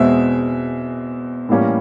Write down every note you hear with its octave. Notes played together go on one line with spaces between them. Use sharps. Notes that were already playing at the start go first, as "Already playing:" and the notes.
Already playing: E2 B2 G#3 C4 E5
A2 E3 G3 A#3 C#4